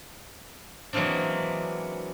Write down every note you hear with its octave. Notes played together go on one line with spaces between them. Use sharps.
E3 F#3 G#3 A#3 C4 D4